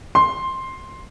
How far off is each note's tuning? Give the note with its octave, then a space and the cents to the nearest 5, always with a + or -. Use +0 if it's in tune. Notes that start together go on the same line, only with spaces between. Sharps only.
C6 +5